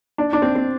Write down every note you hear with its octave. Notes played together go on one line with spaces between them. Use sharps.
D4
D4
C4
C4